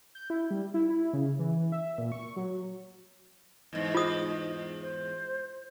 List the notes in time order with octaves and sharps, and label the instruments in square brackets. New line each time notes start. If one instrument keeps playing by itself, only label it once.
[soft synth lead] G6
E4
G3
E4
E4
C#3
E3
E5
A#2
C#6
F#3
[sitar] E2 G#2 [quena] D#5
[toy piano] F4 D#6 [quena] D#5
[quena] C5